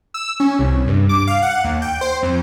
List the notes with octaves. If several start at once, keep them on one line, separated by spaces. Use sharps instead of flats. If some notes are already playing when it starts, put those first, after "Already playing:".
E6
C#4
C2
G2
D6
F5
F#5
D#2
G5
C5
F2